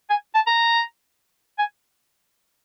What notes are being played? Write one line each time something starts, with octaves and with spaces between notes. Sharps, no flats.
G#5
A5
A#5
G#5